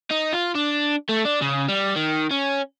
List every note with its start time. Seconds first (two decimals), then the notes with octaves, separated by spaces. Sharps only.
0.10 D#4
0.33 F4
0.55 D4
1.09 A3
1.25 D4
1.42 C#3
1.69 G3
1.96 D#3
2.31 C#4